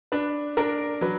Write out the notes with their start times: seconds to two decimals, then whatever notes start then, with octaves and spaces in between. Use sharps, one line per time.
0.12 D4 B4
0.57 D4 A#4
1.01 F#3 B4